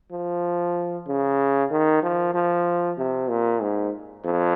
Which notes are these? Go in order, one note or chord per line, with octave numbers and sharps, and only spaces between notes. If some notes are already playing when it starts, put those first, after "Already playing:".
F3
C#3
D#3
F3
F3
C3
A#2
G#2
F2